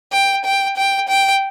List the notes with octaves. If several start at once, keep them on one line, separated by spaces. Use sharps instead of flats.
G5
G5
G5
G5